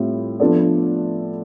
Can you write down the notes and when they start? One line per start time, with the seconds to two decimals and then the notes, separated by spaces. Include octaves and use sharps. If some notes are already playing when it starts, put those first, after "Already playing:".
Already playing: A2 G3 C4 F4
0.40 F3 B3 D4 A4 D5